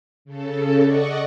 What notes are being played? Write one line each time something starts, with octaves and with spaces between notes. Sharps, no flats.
C#3 A4
D5 D#5 F#5 C#6